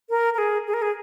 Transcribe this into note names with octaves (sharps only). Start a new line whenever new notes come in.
A#4
A#4
G#4
G#4
A#4
G#4